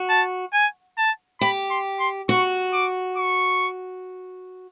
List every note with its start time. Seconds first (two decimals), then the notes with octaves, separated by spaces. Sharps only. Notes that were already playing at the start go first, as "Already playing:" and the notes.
Already playing: F#4
0.09 A5
0.53 G#5
0.97 A5
1.41 G4 B5
1.70 C6
2.00 C6
2.29 F#4 C#6
2.73 D6
3.17 C#6